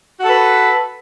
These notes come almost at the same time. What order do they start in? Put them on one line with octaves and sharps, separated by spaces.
F#4 A4 B4